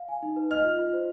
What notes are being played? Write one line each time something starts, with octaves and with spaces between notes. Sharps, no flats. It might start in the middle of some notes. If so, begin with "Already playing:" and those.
Already playing: F5
G#5
D#4
B4
D#5 F6
F4
F4
C5